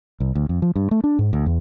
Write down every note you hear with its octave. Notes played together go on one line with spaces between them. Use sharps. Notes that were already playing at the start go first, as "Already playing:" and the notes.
C2
D2
F2
F3
G2
A3
D4
G#2
D2
E2